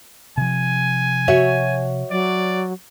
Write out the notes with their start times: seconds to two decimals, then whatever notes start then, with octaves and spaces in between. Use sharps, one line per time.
0.37 C3 F3 G#5
1.28 F#4 C#5 E5
2.11 F#3 D5